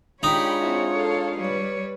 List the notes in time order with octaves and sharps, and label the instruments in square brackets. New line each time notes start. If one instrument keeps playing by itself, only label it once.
[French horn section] G#3 D4 F4 [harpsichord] D#4 [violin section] G4 B5 [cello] C#5
[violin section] C4 E4 F#4
A4 F5
[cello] G3 C#5 [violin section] B4